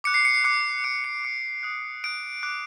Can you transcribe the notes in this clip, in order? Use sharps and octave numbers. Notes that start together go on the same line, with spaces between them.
D6 F#6 C#7
C7
C#7
C7
D6 F#6 C#7
D6 F#6 D7
C#7
D6 F#6 C#7
D#6 F#6
D#6 F#6 D7
D6 F#6